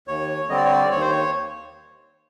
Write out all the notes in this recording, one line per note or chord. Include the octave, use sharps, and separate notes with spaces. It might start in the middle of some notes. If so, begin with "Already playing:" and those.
D#2 C#5
D3 G3 C4 D#5
D5
C#5
D5
D#2 C#5
C5
C#5